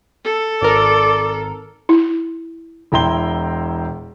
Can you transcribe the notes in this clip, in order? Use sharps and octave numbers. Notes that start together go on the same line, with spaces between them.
A4
G#1 A#4 D5
E4
E1 E4 G5 A#5 C6 G7